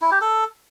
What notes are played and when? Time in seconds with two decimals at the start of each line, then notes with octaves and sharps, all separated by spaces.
0.02 E4
0.11 G4
0.21 A4